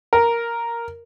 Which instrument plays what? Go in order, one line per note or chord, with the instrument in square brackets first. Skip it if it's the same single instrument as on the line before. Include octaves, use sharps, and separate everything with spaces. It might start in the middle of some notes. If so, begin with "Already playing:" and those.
[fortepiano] A#4